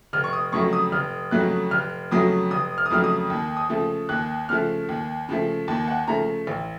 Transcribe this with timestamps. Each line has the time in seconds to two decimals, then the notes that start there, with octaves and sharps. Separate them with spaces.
0.13 F1 F6
0.24 C#6
0.33 D#6
0.52 F2 C#3 F#3 A3 C#6
0.73 D#6
0.92 F1 F6
1.31 F2 C#3 F#3 A3 F#6
1.71 F1 F6
2.11 F2 C#3 F#3 A3 D#6
2.51 F1 D#6
2.78 F6
2.86 D#6
2.90 F2 C#3 F#3 A3 F6
3.04 D#6
3.30 D#2
3.57 D#6
3.70 C#3 F3 A3
4.09 D#2 F#6
4.49 C#3 F3 A3 F6
4.89 D#2
5.29 C#3 F3 A3
5.68 D#2 A5
5.88 F#5
6.08 C#3 F3 A3 A#5
6.47 A1